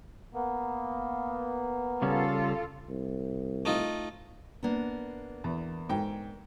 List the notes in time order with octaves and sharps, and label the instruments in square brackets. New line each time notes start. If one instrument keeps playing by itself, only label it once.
[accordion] A#3 B3
[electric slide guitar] C#3 G3 C#4 [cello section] F4 A4
[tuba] C2
[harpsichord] A3 D#4 F4
[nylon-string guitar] A#3 B3 D4
[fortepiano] E2
G#2 G5